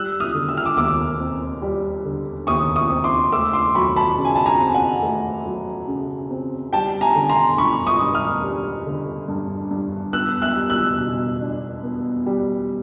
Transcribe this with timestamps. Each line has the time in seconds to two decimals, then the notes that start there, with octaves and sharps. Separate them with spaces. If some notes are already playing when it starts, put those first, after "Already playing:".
Already playing: G3 E6 F#6
0.20 D#6 F6
0.35 D3
0.49 E6
0.57 F6
0.66 D6 E6
0.77 D#2 D6 E6
1.20 C4
1.62 G3
2.05 D3
2.47 D#2 C#6 D#6
2.76 C#6 D#6
2.90 C4
3.04 C6 D6
3.32 A3 D6 E6
3.53 C6 D6
3.75 F#3 B5 C#6
3.96 A5 B5
4.18 C#3
4.25 G#5
4.36 A5
4.46 G#5 A#5
4.60 C4
4.74 F#5 G#5
5.03 A3
5.46 F#3
5.88 C#3
6.30 C4
6.73 G3 G5 A5
7.01 G#5 A#5
7.15 D3
7.30 A#5 C6
7.58 G2 B5 C#6
7.87 C#6 D#6
8.01 G2
8.14 D#6 F6
8.43 G3
8.86 D3
9.28 G2
9.71 G2
10.13 B3 E6 F#6
10.42 E6 F#6
10.56 G3
10.70 E6 F#6
10.98 B2
11.41 D4
11.83 B3
12.26 G3